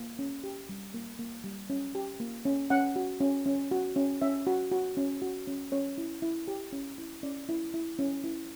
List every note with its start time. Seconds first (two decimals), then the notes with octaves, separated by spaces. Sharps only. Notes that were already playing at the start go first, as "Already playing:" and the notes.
Already playing: A#3
0.19 C#4
0.44 G4
0.69 G3
0.94 A#3
1.19 A#3
1.44 G3
1.70 C#4
1.95 G4
2.20 A#3
2.45 C#4
2.70 C#4 F#5
2.96 F#4
3.20 C#4
3.46 C#4
3.71 F#4
3.96 C#4
4.22 C#4 E5
4.47 F#4
4.72 F#4
4.97 C#4
5.22 F#4
5.47 C#4
5.72 C#4 C#5
5.98 E4
6.22 E4
6.48 G4
6.73 C#4
6.98 E4
7.23 C#4 D5
7.49 E4
7.74 E4
7.99 C#4
8.24 E4